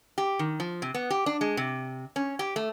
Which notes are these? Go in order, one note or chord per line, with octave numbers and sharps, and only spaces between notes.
G4
D#3
F3
C3
B3
G4
D4
G#3
C3
C#4
G4
A3